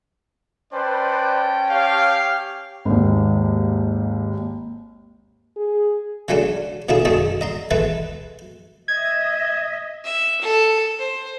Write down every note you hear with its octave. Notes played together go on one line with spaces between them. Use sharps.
C#4 B4 C5 D5 G5 A5
G4 C#5 F5
G#1 D#2
G#4
C#3 F#3 G#3 A3 C#4 D4
B2 D3 A#3 E4 G#4
F#2 D#3 A3 G#4 D#5 A5
D#5 A#5 C6
E3 G#3 A3 E4 B4
D#5 E5 G#6
E5
A4
C5